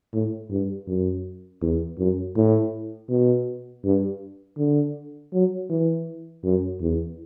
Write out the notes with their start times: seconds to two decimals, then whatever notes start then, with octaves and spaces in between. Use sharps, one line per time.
0.13 A2
0.50 G2
0.87 F#2
1.62 E2
1.99 F#2
2.36 A2
3.10 B2
3.84 G2
4.58 D3
5.33 F#3
5.70 E3
6.44 F#2
6.81 E2